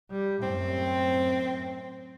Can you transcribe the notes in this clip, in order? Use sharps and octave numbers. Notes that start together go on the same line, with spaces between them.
G3
F#2 A2 C4